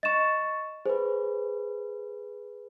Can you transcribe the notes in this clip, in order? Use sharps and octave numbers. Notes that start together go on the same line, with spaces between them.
D#5 C#6 A6 E7
G#4 B4 C5